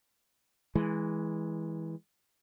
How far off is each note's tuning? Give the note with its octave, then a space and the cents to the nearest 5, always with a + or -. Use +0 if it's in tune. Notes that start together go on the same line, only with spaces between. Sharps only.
E3 -15 G#3 +0